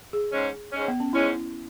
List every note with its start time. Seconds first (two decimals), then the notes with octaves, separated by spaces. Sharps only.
0.13 G#4
0.31 G#2 G#3 C#4
0.72 G#2 G#3 C#4
0.88 B3
1.00 C#4
1.13 G#2 G#3 C#4 E4